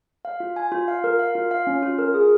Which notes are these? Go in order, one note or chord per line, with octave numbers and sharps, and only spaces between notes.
F5
F4
G#5
F4
F5
A#4
F5
F4
F5
C#4
F4
A#4
G#4